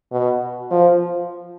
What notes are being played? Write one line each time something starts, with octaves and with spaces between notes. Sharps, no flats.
B2
F3